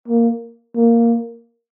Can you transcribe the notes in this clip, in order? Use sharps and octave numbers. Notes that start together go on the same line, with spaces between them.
A#3
A#3